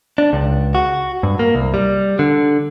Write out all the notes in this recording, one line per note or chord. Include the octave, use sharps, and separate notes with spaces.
D4
C#2
F#4
G2
A#3
C2
G3
D3